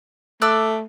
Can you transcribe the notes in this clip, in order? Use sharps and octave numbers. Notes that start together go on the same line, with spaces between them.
A3 D5 E6 F#6